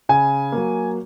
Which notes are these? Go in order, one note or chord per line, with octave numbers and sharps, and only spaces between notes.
C#3 G#5
F#3 A#3